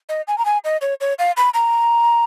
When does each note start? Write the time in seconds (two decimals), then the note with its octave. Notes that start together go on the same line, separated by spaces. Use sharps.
0.09 D#5
0.28 G#5
0.38 A#5
0.45 G#5
0.64 D#5
0.81 C#5
1.01 C#5
1.19 F5
1.37 B5
1.54 A#5